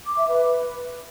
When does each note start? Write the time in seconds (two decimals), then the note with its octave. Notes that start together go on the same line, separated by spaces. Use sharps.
0.06 D6
0.17 E5
0.28 B4